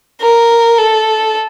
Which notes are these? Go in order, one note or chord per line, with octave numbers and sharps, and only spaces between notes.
A#4
A4